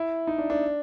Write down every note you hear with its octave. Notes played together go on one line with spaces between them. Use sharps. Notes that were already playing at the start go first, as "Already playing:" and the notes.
Already playing: E4
D#4
D4
D4